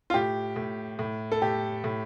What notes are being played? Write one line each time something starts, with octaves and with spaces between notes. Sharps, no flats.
F4
A2 G4
A2
A2
A4
A2 G4
A2